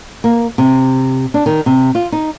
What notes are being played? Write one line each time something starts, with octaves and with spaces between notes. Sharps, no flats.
A#3
C3
D4
D#3
C3
F4
D#4